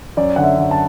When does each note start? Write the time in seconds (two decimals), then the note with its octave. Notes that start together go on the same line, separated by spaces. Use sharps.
0.17 F#2 D5
0.36 D3 F#5
0.44 E5
0.58 F#2
0.71 A5